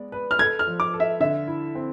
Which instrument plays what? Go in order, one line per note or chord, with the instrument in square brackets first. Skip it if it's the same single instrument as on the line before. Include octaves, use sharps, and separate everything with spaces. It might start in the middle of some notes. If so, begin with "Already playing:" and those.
Already playing: [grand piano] G#3 B3 D5
B4
[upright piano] F6
[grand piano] A4 [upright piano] G#6
[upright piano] F6
[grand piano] F3
[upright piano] D6
[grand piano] A4
[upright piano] E5
[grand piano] D3 [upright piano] E5
[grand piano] E4
C4